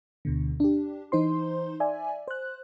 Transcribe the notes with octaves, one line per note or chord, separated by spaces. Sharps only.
D2 B2 D3
D4 G4
E3 D#4 C5 C6
D5 E5 G#5
C5 F#6